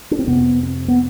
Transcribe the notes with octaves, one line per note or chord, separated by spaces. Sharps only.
D4
C4
F2 C3 B3
C4
B3